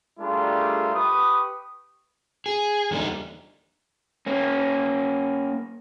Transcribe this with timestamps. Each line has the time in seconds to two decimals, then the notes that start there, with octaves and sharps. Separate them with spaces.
0.20 G3 A3 D4 F4 G#4 A#4
0.94 G4 B4 C#6 D#6
2.46 G#4
2.91 E2 D3 G3 A#3 D#4
4.26 A#3 C#4